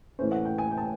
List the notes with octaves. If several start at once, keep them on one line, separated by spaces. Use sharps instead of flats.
A2 E3 A3 C#4 C5
F#5
G5
G#5
G5
A5